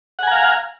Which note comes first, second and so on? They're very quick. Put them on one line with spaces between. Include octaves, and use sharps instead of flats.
F#5 G#5 A#5 F5